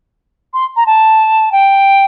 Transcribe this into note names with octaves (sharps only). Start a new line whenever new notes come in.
C6
A#5
A5
G5